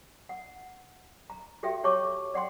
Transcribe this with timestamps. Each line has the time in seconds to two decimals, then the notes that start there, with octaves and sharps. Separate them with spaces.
0.29 F#5
1.30 A#5
1.63 F#4 G4 A4 E5 G5
1.84 G4 C#5 A5 C#6 D6
2.34 D5 F#5 G5 C6